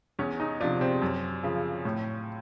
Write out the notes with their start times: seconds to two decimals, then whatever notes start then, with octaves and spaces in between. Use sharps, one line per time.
0.19 E2 C#4
0.40 D#4
0.60 C3 F3 D4
0.81 C4
1.02 F#2
1.43 C#3 F3
1.85 A2